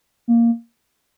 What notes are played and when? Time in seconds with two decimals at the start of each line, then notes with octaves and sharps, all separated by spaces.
0.28 A#3